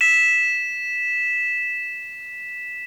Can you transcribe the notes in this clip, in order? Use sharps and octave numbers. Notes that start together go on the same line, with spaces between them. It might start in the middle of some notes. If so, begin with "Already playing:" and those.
B6 E7